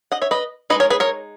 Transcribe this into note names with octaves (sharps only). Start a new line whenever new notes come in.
D#5 F#5
C#5 E5
B4 D#5
G#3 B3 D#4 B4 D#5
A#4 C#5
G#4 B4
A#4 C#5